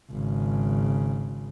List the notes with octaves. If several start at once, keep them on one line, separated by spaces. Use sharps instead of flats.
G#1 C#3